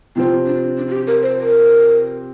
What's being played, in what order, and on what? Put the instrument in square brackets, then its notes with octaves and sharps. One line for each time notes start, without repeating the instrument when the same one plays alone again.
[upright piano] C3 F3 C4 [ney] F4
[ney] D4
D4
F4
G4
A#4
C5
A#4